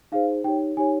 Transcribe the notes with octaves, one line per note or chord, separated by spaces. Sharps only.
D#4 G#4 C5 F5
D#4 G4 C#5 G5
D#4 G4 C#5 G#5